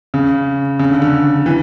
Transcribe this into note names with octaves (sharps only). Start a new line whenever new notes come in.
C#3
C#3
D3
D3
E3